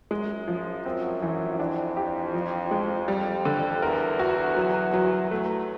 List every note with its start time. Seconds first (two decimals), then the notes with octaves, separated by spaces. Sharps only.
0.11 F#2 G#3
0.48 F3
0.85 F#2 C4
1.22 E3
1.59 F2 D4
1.97 G4
2.34 F3
2.71 G#3
3.08 G3
3.45 D3
3.82 E2 A#4
4.19 F#4
4.56 F#3
4.93 F#3
5.31 E2 A3